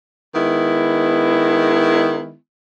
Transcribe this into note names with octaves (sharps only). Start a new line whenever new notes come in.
D#3 G#3 B3 E4